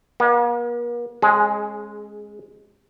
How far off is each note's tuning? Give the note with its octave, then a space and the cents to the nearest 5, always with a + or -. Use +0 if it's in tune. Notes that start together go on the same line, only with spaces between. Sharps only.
A#3 +45 D#5 +0
G#3 +0 C#4 -35 G#4 +20